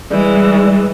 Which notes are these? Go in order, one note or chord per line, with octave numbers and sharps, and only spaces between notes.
E3 G3 G#3